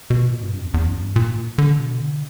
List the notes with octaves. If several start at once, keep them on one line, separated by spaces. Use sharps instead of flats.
B2
A#2
G2
F#2
E2
E2
F#2
G2
A#2
D3
B2
D3